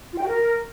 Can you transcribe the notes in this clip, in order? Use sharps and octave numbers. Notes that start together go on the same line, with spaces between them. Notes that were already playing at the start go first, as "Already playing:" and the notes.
F4
G5
F#4
A#4